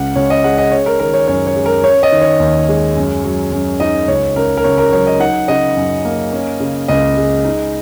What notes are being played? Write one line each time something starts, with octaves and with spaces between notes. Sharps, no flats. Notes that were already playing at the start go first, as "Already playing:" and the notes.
Already playing: C#2 C#3 F#5
C#2 C#5
D#5
G#3 F#5
D#5
C#4 C#5
A#4
D#3 A#4
C#5
F#2 C#5
C#5
G#3
A#4
C#4 C#5
D#5
D#3
C#5
D#2
G#3
F#2
F#3
F#2
D#4 D#5
C#2 C#5
C#3 A#4
A#4
C#2 C#5
A#4
F#3 C#5
D#5
D#4 F#5
C#3 D#5
F#2
A#3
C#4
C#3
C#2 D#5
G#3
D#4